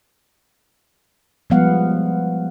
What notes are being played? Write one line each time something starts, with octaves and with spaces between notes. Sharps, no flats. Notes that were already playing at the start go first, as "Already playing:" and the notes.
F3 G3 G#3 B3 F5 F#5